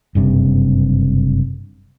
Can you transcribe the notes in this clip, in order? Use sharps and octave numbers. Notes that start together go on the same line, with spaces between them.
F#1 G2 C3